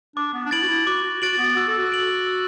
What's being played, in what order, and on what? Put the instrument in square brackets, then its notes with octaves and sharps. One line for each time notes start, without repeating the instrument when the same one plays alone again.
[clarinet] D4 [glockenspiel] D6
[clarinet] B3
D4
[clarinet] E4 [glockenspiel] A6 D7 F#7
[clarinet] F#4
E4
[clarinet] F#4 [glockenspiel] D6
[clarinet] F#4
[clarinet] F#4 [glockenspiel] A6 D7 F#7
[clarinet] B3
[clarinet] F#4 [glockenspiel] E6
[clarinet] A4
F#4
[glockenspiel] D7 F#7
E6